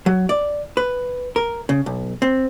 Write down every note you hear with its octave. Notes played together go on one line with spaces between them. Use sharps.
F#3
D5
B4
A#4
C#3
B1
C4